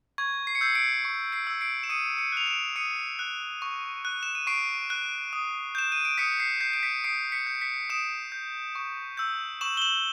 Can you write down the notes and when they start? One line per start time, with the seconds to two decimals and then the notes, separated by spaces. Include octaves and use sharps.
0.18 C#6 G#6
0.47 C7
0.55 C#7
0.61 E6 G6 C7
0.75 C7 D7
1.05 C#6
1.32 C7 D7
1.47 E6 G6
1.61 C7 D7
1.83 E7
1.89 D#6 C#7 D#7
2.18 C#7 D#7
2.32 F#6 F7
2.47 D7 E7
2.76 D#6 C#7 D#7
3.19 F#6
3.62 C#6
4.05 F#6
4.23 E7
4.35 D#7
4.47 C#6 C7 D7
4.90 F#6
5.33 D#6
5.75 G6 E7
5.92 D#7
6.05 D7
6.18 D#6 B6 C#7
6.40 C7
6.61 G6 C7
6.73 D7
6.83 B6 C#7
7.04 D#6 C7 D7
7.32 B6 C#7
7.47 G6
7.62 B6 C#7
7.90 D#6 D7 E7
8.32 G6
8.75 C#6
9.17 E6 G6
9.61 C#6 E7 F#7
9.77 G7
9.82 E7 F#7